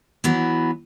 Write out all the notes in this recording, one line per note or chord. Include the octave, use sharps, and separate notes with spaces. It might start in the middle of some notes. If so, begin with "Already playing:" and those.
E3 F#3 B3